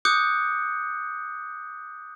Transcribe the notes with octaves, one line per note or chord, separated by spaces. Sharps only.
D6 D#6 F#6 G6 C#7